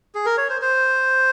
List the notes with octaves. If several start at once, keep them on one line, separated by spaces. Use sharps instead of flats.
G#4
A#4
C#5
C5
C5